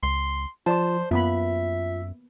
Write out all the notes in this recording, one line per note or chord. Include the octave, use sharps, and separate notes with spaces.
C#2 C6
F3 F4 C5 D5 A5 C6
F#2 A#3 B3 F4 E5 B5